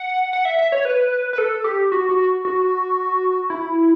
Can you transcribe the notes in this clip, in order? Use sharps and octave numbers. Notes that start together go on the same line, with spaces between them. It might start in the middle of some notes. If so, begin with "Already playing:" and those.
Already playing: F#5
F#5
E5
E5
C#5
B4
B4
A4
G4
F#4
F#4
F#4
E4